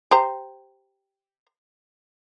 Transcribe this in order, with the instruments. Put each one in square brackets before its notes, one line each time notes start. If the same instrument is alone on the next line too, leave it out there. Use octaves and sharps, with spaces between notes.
[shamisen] G4 C5 A#5